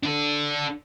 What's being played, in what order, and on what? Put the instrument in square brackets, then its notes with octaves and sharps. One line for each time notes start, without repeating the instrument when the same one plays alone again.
[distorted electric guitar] D4 A4